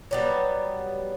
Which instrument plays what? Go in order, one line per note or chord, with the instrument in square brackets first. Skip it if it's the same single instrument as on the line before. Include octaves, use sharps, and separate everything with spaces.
[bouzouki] F#3 G3 B3